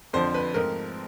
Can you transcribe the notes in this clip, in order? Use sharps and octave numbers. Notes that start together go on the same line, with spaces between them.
F2 D3 F3 C5
B4
G#2 F3 A3 C4 A#4